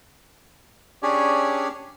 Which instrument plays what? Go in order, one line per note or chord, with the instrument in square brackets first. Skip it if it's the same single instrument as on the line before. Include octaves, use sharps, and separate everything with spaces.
[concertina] C#4 D4 G4 G#4 C#5 D5